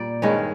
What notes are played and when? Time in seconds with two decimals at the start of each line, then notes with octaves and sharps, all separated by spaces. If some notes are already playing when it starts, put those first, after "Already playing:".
Already playing: A#2 G3 D5
0.22 G2 D#3 G#3 C#4